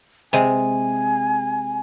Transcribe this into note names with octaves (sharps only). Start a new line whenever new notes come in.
C3 G#3 G#5